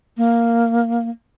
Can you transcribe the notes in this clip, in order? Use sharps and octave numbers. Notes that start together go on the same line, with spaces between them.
A#3